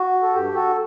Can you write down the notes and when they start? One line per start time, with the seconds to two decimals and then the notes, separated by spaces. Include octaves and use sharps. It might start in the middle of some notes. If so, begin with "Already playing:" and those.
Already playing: F#4
0.23 A4
0.34 G2 G4
0.55 F#4 A4